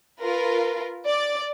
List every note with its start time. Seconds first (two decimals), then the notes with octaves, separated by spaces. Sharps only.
0.21 F4 A#4 B4
1.04 D5